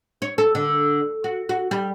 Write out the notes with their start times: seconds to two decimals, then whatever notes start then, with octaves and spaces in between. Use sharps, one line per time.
0.22 C#5
0.38 A4
0.55 D3
1.24 F#4
1.49 F#4
1.71 G3